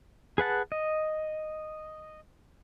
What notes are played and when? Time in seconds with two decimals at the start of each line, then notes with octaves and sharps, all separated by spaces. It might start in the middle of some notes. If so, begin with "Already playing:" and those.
0.38 G#4 B4 F#5 A5
0.72 D#5